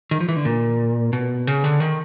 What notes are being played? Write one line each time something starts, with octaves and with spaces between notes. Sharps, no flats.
D#3
F3
E3
D3
A#2
B2
C#3
D3
D#3